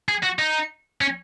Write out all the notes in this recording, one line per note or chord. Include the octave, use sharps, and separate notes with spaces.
G#4
F#4
D#4
C#4